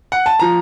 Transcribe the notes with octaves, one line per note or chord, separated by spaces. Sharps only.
F#5
A5
F3 A#5